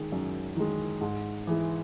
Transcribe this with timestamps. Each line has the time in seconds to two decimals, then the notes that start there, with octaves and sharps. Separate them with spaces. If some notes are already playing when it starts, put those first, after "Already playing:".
Already playing: D#3 G#3
0.12 F#2
0.57 D#3 G#3
1.01 G#2
1.47 E3 G#3